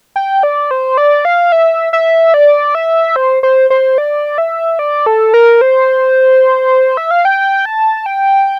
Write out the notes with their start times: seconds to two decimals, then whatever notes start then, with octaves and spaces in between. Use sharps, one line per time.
0.16 G5
0.43 D5
0.71 C5
0.98 D5
1.25 F5
1.52 E5
1.93 E5
2.34 D5
2.75 E5
3.16 C5
3.43 C5
3.70 C5
3.98 D5
4.38 E5
4.79 D5
5.06 A4
5.34 A#4
5.61 C5
6.97 E5
7.11 F5
7.25 G5
7.65 A5
8.06 G5